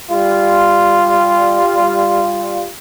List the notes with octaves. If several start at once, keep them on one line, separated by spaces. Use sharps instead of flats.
G3 F4